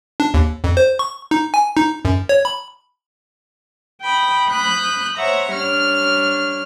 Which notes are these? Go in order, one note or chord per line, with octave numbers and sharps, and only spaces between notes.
D4
D#2
F2
C5
C#6
D#4
G#5
D#4
F#2
C#5
B5
G5 B5 D#6
B5 D#6 F#6 G6
C5 C#5 E5 F#5 A#5
G3 D4 C#5 F6